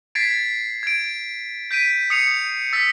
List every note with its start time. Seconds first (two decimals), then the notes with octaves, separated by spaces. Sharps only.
0.15 G#6 A6 B6 C7 D7
0.83 G#6 D7
1.71 G6 B6 D7 D#7
2.10 D#6 C7 C#7 D#7 F7
2.73 E6 A6 B6